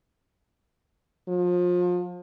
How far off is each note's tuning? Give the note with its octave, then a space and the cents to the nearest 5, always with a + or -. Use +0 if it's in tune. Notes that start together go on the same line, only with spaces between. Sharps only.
F3 +30